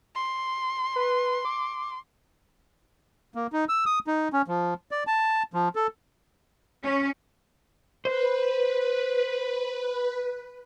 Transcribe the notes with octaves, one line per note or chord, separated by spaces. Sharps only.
C6
B4
D6
A#3
D#4
E6
D#6
D#4
C#4
F3
D5
A5
F3
A4
C#4
B4 C5